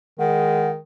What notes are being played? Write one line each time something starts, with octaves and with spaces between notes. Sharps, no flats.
D#3 G#3 F#5